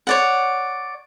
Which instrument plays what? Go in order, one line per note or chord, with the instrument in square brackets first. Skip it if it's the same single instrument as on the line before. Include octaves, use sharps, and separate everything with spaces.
[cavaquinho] C#5 D5 F#5